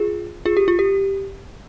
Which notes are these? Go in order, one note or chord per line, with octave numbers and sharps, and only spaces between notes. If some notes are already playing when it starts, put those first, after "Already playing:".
Already playing: F4 G#4
F4 G#4
G4
F4
G4